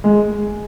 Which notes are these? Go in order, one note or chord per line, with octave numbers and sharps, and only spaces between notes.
G#3